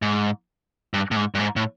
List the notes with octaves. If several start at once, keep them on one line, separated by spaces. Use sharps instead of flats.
G#2
G2
A2
G#2
G2
G#2
A2